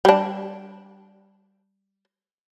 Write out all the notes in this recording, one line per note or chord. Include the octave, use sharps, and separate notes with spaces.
G3 D4